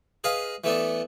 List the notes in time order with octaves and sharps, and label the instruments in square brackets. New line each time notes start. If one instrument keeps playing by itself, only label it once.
[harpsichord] G#4 B4 D#5 F5
E3 A3 B3 D4